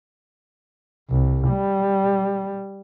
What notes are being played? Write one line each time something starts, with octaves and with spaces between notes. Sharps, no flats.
C2
G3